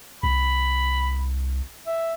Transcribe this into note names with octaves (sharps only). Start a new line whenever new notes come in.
C2 B5
E5